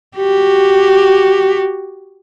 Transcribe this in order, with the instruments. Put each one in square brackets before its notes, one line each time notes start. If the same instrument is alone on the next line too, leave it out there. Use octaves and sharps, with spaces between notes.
[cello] F#4 G4